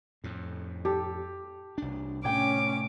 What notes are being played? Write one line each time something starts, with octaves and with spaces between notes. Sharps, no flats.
F2 A2
G4 A4
C2 D4
A2 C3 A3 C#4 C#5 G5 D6